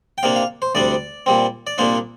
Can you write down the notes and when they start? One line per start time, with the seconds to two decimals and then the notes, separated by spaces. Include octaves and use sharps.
0.18 G5
0.23 C3 A#3 D4 F5
0.36 F5
0.62 C5
0.75 D2 C3 G3 D4 D5
1.26 A#2 G3 C4
1.67 D5
1.78 C2 A#2 A#3 D4 C5